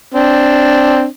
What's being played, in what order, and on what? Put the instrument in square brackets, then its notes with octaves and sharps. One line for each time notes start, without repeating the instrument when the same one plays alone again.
[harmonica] C4 D4